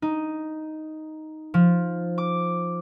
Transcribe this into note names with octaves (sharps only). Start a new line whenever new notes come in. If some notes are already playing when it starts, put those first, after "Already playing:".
D#4
F3
D6